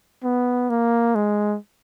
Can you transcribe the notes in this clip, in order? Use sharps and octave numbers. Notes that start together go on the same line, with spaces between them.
B3
A#3
G#3